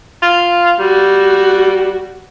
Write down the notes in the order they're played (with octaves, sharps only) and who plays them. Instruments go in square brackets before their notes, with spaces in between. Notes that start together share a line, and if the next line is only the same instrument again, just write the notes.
[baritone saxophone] F4
[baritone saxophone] G3 [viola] F#4